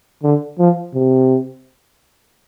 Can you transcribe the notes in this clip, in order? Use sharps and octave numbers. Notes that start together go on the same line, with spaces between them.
D3
F3
C3